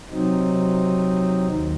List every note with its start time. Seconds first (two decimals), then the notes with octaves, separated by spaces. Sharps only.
0.11 C3 F#3 C4 D#4
1.47 D#2